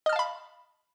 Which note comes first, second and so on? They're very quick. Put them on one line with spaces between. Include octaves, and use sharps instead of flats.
D#5 F6 A5 F5 B5